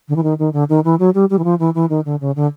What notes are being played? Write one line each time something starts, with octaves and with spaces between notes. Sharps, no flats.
D3
E3
D#3
D#3
D3
D#3
E3
F#3
G3
G3
E3
F3
E3
E3
D#3
D3
C#3
D3